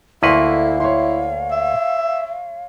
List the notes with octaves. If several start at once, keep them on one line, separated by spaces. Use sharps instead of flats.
D2 A#3 E4 A4 B4 F5 C6 C#6
E4 C#5 C6
E5